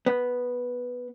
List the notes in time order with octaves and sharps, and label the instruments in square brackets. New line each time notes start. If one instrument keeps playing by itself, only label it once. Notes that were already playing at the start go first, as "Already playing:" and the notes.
[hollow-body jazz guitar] B3